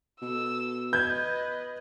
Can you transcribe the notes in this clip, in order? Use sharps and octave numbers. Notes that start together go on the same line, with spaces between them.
B2 A4 E6
B4 D#5 G6 G#6